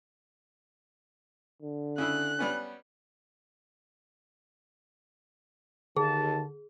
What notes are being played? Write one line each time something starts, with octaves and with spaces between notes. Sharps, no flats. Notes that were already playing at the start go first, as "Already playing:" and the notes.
D3
C#3 E4 F#6
G3 B3 C#4
D#2 D3 D#3 G#4 A5